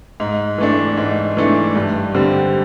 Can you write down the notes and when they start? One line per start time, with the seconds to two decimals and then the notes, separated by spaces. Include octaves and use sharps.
0.20 G#2
0.58 E3 A3 D4
0.97 G#2
1.37 E3 A3 D4
1.75 G2
2.14 D3 G3 C4